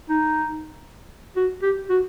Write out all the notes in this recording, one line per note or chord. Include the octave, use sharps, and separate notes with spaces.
D#4
F#4
G4
F#4